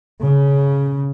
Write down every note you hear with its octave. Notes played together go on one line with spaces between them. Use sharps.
C#3